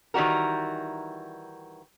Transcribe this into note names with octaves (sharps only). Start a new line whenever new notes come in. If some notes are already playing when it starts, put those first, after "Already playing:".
D#3 E3 G3 F#4 A#4